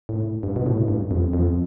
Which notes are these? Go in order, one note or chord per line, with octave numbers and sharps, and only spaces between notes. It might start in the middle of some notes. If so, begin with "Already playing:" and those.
A2
G2
B2
A2
G2
F2
F2